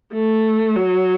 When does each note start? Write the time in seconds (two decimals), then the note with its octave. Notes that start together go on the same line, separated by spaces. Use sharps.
0.13 A3
0.75 F#3